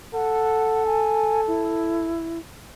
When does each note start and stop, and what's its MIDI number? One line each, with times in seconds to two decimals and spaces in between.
0.14 2.14 69
0.14 0.83 78
0.86 1.41 80
1.48 2.39 64